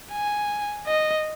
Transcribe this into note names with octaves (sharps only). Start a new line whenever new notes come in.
G#5
D#5